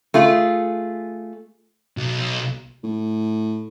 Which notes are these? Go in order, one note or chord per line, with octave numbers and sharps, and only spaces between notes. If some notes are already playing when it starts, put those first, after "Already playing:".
A3 F4 G#4
B1
A2